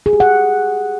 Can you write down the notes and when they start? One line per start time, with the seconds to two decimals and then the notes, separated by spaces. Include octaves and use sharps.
0.06 G#4
0.13 G4
0.20 F#5